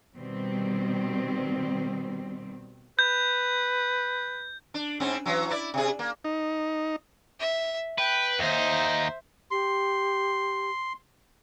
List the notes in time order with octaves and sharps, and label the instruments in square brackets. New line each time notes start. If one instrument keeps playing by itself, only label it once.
[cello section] B2 D#3 G3 C4
[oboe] B4 [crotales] G6
[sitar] D4
G#2 C4 C#4
E3 F#3
E4 D5
C3 G#4
A#3
[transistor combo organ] D#4
[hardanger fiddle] E5
[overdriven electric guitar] B4 [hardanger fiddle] G5
[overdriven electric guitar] D#2 D#4 [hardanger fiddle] C5 E5
[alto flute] G4 [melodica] C6